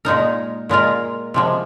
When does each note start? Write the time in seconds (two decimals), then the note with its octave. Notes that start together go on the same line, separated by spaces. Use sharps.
0.05 A#2 G#3 D#4 A#4
0.69 A#2 G#3 F4 A#4
1.34 C3 F3 G#3